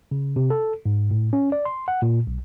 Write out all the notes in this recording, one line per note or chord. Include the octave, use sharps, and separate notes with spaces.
C#3
C3
A4
G#2
A2
C#4
D5
C6
F#5
A#2
B1